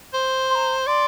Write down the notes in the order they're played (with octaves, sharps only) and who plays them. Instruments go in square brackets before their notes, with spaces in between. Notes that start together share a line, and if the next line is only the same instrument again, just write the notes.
[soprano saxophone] C5
[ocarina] C6
A#5
[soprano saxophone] D5 [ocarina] C6